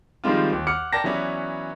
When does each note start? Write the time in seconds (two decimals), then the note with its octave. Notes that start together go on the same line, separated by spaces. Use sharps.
0.24 D#3 F3 G3 G#3 C4 F4
0.53 D#2
0.67 F#5 D6 F6 C#7
0.93 A#4 D5 G5 A5 A#6
1.04 E3 F#3 B3 C#4 D5